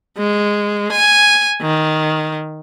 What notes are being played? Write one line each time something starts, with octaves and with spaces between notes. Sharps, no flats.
G#3
G#5
D#3